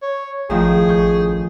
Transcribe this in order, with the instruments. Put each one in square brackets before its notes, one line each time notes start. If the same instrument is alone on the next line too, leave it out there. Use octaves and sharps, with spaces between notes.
[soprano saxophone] C#5
[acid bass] A1 [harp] A2 D#3 F3 [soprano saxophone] G#4
[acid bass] A1 [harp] C#6 G6